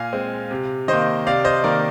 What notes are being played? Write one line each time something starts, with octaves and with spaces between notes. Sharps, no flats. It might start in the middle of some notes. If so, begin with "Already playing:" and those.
Already playing: A#2 F5 G#5
G#3 C4
C3
D#3 A#3 C5 D#5
C3 D5 F5
C5 D#5
D#3 A#3 A#4 D5